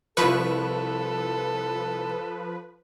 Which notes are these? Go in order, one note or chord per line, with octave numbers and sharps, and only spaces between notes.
C2 F3 E4 A4 B4 C#6